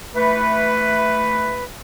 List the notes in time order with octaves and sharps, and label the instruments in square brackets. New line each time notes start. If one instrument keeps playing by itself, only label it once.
[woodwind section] E3 A3 B4